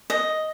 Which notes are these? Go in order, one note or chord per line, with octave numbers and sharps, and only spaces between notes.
D#5